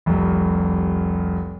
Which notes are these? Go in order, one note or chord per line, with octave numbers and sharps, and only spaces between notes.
F1 C2